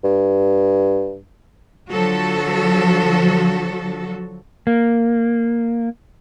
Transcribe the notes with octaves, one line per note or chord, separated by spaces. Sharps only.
G2
D3 F3 F#3 F#4 A4
A#3